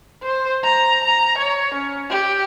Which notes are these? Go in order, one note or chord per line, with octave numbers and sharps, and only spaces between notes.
C5
A#5
A#5
C#5
C#4
G4